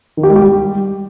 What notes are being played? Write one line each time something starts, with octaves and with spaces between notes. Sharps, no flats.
D#3
G4
G#3
G4
G3